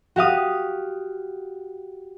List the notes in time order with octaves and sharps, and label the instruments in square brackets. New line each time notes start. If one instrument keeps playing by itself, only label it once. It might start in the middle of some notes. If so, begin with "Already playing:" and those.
[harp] F#4 G4 F5 D#6